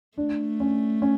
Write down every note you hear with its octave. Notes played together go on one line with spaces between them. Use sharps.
A3 D4
C#4
C#4